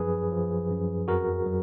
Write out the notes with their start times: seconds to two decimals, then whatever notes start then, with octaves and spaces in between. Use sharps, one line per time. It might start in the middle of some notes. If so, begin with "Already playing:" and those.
Already playing: F#2 F3 G#4 B4
0.32 F3
0.71 F#2
1.08 F2 F#4 A#4
1.46 F#3